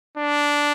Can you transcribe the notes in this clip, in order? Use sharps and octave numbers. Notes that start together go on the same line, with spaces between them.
D4